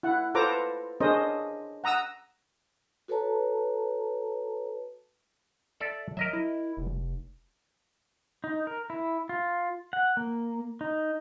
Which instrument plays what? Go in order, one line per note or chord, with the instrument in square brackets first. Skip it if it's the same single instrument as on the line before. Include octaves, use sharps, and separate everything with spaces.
[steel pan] E4 F#5
F4 A4 B4 C5 A#5 D6
C#4 D4 G#4 A#4 C5 D#5
F#5 A#5 D#6 E6
[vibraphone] F#4 A4 B4 C#5 A5 A#5
[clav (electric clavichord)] A4 D5 E5
[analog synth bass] F#3 [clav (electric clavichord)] A#4 D#5 E5
[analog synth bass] E4
F1
[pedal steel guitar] D#4
A#4
E4
F4
F#5
A#3
D#4